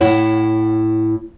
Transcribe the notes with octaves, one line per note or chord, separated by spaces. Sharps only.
A2 E4 C#5 F#5